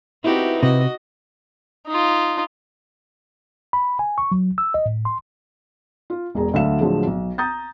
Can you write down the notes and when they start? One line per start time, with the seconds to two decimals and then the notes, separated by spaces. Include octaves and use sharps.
0.24 B3 C4 D#4 E4 F#4 G4
0.63 C3 F#4 D#5
1.87 D#4 F4
3.73 B5
3.99 G#5
4.18 C#6
4.32 F#3
4.58 E6
4.74 D#5
4.86 A2
5.05 C6
6.10 F4
6.35 E1 E2 G#4 A#5
6.53 D2 D3 F#3 E5 F5 E7
6.81 A2 D3 F3 F#3 G#3
7.07 B1
7.38 A#5 D#6 G6 A6